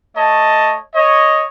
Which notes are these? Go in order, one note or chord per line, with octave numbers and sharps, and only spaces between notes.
A3 C#5 D#5 A5
C#5 D#5